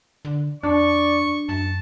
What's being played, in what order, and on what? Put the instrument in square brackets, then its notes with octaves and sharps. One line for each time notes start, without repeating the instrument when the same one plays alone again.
[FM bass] D3
[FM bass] F2 [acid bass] D4 [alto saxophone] D5 [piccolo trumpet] C#6
[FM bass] F#2 [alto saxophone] A5